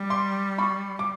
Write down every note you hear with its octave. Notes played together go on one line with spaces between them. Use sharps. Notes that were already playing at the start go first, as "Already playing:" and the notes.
Already playing: G3
C6 D6
B5 C#6
D6